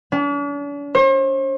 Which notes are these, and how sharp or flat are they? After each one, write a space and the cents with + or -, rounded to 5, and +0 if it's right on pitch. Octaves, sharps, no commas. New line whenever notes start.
D4 -45
C5 +45